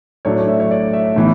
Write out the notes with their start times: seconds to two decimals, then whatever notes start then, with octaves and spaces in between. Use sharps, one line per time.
0.25 A2 F#3 A3 D4 C#5
0.48 E5
0.60 C#5
0.71 D5
0.93 E5
1.16 A2 E3 B3